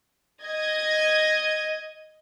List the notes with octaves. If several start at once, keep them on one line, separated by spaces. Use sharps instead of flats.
D#5 G#6